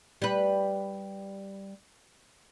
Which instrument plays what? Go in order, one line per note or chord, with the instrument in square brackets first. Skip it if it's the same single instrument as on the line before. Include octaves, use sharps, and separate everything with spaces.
[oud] G3 B4